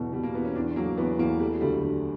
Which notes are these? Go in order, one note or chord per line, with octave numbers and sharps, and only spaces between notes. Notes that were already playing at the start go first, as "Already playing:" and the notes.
Already playing: E2 B2 F#3
B2 G3
A#3
E2 B3
C#4
E2 D4
F#3 A#3
E2 B3
E2 A#3
G3 A3
F#3
D2 G3
F#3
D3 G3